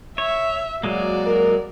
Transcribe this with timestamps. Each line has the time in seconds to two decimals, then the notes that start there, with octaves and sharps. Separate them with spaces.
0.18 C#5 E5
0.83 F#3 G#3 A#3 F#4 D5
1.26 A#4